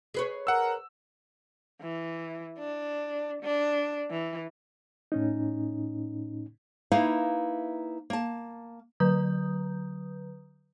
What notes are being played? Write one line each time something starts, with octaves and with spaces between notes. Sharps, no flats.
G#4 B4 C#5
A#4 F#5 E6
E3
D4
D4
E3
A2 C#4 D#4
A#3 D#4 E4 B4 E5 F5
A#3 A5
D3 F#3 B4 A#5 D#6 G6